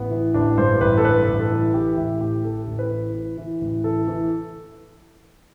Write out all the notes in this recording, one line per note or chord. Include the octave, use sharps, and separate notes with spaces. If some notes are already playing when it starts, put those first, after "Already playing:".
Already playing: A1 B3
E3
A1 D4
G2 C5
A1 B4
A4
G2 B4
A1
A4
E3
E3 G4
A1 E4
A2 G4
E3 A4
A1
B4
E3
E3
E3
A1
E3 A4
E3